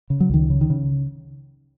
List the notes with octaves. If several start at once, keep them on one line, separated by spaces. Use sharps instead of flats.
C#3
F#3
C#2 D#3
C#3
D#3
C#3